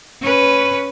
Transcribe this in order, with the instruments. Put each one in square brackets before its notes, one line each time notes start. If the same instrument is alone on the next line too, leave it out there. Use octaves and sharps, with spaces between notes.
[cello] C#4 B4